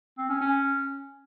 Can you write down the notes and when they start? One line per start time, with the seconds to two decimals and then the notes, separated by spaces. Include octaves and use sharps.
0.18 C4
0.29 C#4
0.41 C#4